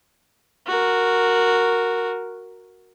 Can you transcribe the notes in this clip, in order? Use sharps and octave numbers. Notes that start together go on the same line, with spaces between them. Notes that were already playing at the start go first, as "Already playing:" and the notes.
F#4 A#4